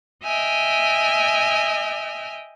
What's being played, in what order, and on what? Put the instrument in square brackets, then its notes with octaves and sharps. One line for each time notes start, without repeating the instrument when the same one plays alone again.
[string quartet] D#5 E5 G5 G#5 F6